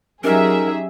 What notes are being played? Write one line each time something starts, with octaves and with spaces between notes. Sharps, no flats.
F#3 C#4 D#4 G4 G#4 A#4 D#5 E5